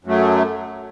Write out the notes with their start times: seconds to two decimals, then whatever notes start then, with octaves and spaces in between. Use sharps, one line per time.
0.05 F#2 F#3 A3